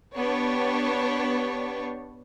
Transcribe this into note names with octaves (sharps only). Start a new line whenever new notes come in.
B3 D4 G4 C#5